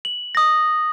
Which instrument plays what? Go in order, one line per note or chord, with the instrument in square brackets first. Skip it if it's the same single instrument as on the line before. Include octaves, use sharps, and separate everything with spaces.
[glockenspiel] F#7
D#6 A#6